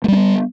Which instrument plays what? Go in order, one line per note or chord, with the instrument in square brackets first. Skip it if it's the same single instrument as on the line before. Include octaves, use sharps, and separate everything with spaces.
[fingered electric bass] A3
G3
C#4
B3